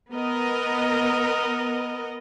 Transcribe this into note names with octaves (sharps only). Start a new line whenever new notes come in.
B3 A#4 D#5